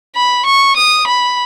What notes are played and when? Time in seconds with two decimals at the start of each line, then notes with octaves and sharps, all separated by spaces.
0.16 B5
0.46 C#6
0.76 D#6
1.07 B5